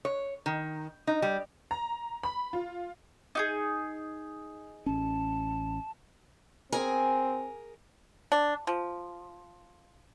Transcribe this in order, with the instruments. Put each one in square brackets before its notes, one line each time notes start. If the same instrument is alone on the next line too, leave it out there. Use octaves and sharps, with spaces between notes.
[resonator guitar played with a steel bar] C#5
D#3
D#4
G3
[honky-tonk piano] A#5
B5
F4
[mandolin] D#4 G4 G#4
[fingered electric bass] A1 C#4 [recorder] A5
[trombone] C4 [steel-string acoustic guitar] G#4 A#4 G#5
[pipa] D4
F3